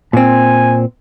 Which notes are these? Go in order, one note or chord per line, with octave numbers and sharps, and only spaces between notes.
A#2 C4 G#5